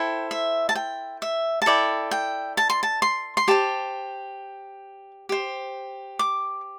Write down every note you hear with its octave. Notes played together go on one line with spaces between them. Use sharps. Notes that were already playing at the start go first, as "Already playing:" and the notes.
Already playing: E4 A4 C5 G5
E5
A5
G5
E5
A5
E4 A4 D5 G5
G5
A5
C6
A5
C6
C6
G4 C5 A5
G4 C5
D6